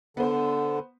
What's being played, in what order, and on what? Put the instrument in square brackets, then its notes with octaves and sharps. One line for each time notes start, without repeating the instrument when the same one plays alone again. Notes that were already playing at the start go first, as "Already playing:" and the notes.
[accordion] D3 [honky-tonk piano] B3 C5